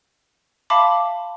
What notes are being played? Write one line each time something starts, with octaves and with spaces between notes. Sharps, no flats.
E5 F5 A5 B5 C6 D6